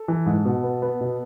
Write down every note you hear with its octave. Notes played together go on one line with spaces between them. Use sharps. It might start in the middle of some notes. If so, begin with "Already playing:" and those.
Already playing: A4
E3
G#2
B2
B3
B3
B2